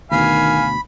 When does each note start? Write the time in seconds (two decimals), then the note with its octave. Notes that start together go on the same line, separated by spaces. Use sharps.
0.12 D2 B2 D#3 F5 G#5 B5